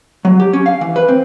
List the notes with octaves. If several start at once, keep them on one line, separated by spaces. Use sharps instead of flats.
F#3
G4
C#4
F5
E3
B4
C4